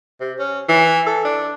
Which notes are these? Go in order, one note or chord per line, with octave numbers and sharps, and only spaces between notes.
C3
C#4
E3
A4
D4